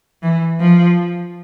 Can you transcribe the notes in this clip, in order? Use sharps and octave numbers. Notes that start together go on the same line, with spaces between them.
E3
F3